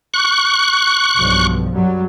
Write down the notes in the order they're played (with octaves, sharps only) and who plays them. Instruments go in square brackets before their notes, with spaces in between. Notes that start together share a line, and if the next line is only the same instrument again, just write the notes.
[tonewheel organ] C#6 F#6
[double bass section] B1 G2 F3
F#2 F#3 G3